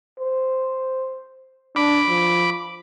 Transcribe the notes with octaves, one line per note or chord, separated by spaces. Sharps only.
C5
D4 B5 D6
F3